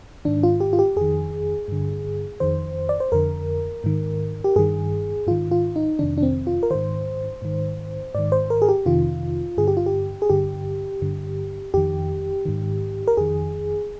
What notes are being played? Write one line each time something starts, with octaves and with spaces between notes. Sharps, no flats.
G#2 D#3 D4
F4
G4
F4
G4
F2 D#3 G#4
G2 D3
F2 D#3 C5
D5
C5
F2 D3 A#4
G#2 D#3
G4
G2 D#3 G#4
G#2 D#3 F4
F4
D#4
F2 C3 D#3 D4
D4
C4
F4
A#4
G#2 D#3 C5
G#2 D#3
G#2 D#3 D5
C5
A#4
G#4
G4
F2 C3 D#3 F4
G2 D3 G#4
G4
F4
G4
G#4
G2 D3 G4
G2 D3
F2 D#3 G4
G#2 D#3
A#4
F2 D#3 G#4